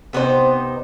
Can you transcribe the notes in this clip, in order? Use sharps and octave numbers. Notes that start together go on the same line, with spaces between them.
C3 B3 D#4 C5